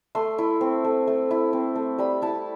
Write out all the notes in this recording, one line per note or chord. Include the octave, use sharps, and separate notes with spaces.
A3 C6
E4
C4
A3
A3
E4
C4
A3
G3 B5
E4 A5